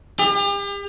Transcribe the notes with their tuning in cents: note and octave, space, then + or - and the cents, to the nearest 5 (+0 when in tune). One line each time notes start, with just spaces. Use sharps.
G4 +40